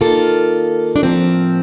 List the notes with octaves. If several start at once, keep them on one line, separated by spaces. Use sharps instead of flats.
D#3 A#3 F4 A4
D4
A2 F3 A#3 C4